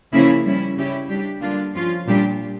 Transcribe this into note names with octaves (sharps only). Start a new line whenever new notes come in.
C#3 F3 A#3 C#4 E4
G3 C#4 E4
C#3 G3 C#4 E4 G4
G3 D4 G4
D3 G3 A#3 D4 F4
F3 C#4 F4
A#2 G3 D4 G4